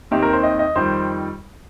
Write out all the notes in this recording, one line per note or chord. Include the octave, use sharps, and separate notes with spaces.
D#2 D#3 C4 D#4 G4
A#4
C5
D#5
D#5
F2 D#3 G3 C5